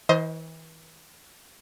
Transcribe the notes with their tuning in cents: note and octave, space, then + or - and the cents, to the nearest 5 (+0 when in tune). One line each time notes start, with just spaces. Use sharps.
E3 -35 C5 +0 D#5 +25